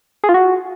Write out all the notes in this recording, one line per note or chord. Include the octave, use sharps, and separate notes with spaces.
G#4
F4
F#4